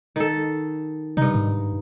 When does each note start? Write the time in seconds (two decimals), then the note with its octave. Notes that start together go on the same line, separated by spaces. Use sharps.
0.16 D#3 A4
1.17 G2 C3 D#4
1.35 G#2